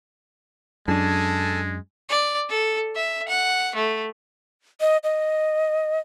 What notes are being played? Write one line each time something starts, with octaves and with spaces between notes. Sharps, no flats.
F#2 G#3 D4 G#4 A4 G#5 A5
D5
A4
E5
F#5
A3
D#5
D#5